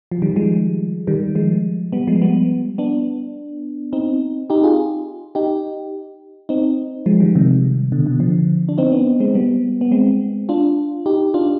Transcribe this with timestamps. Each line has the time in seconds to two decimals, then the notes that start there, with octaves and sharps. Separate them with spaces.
0.12 F3
0.22 D#3 G3
0.36 F3 G#3
1.07 D#3 G3
1.35 F3 G#3
1.93 G3 B3
2.07 F3 G#3
2.22 G3 B3
2.78 B3 D4
3.93 C4 D#4
4.50 D#4 G4
4.63 F4 G#4
5.35 D#4 G4
6.49 C4 D#4
7.06 F3 G#3
7.20 D#3 G3
7.35 C3 D#3
7.92 B2 D3
8.06 B2 D3
8.20 D3 F3
8.69 D4
8.78 C4 D#4
8.92 B3 D4
9.20 G#3 C4
9.34 G3 B3
9.81 B3
9.91 G#3 C4
10.49 D4 F4
11.06 D#4 G4
11.34 D4 F4